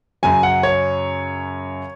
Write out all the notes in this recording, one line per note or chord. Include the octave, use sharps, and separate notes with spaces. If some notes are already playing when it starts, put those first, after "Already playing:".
F#2 C#3 F#3 G#5
F#5
C#5